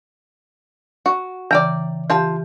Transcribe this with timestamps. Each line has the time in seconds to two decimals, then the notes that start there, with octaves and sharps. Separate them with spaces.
1.06 F#4
1.51 C#3 E3 D5 G5 A#5
2.10 E3 F4 G4 A5